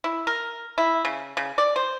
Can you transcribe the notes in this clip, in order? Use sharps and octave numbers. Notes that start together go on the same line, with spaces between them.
E4
A#4
E4
C#3
C#3
D5
C5